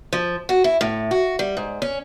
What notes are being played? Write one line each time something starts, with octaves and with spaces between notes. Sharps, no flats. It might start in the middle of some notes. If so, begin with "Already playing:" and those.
F3
F#4
E4
A2
F#4
G3
G#2
C#4